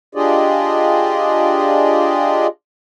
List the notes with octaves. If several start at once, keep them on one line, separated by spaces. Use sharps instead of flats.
D4 F4 G4 G#4 D5 D#5